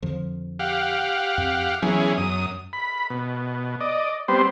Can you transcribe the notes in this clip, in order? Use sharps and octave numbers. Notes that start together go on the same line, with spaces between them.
F2 D3 F3
G4 F5 F#5
F2
E3 F#3 B3 C#4 G#4
F#2 D#6
B5
B2
D5 D#5
G3 B3 C4 C5